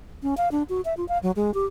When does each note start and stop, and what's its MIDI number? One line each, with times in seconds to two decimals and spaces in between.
0.23 0.35 61
0.37 0.49 77
0.52 0.63 62
0.69 0.81 66
0.85 0.94 76
0.97 1.07 65
1.09 1.18 77
1.23 1.31 54
1.36 1.54 56
1.54 1.66 67